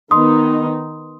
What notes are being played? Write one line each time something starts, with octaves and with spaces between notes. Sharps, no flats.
D#3 B3 D#4 C6 D#6